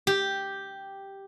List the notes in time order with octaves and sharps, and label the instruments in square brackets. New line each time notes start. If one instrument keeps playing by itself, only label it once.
[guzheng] G4